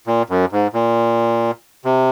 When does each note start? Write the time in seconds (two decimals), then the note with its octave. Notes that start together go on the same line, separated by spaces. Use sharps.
0.07 A#2
0.30 F#2
0.52 G#2
0.74 A#2
1.85 C3